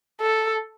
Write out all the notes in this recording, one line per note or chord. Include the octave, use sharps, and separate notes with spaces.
A4